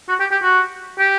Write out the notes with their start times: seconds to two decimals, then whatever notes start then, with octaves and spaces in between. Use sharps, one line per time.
0.09 F#4
0.20 G4
0.31 G4
0.43 F#4
0.99 G4